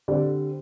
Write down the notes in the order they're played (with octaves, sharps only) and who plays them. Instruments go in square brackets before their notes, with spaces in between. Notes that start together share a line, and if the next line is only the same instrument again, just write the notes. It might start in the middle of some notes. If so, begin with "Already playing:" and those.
[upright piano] D3 G3 C4 D5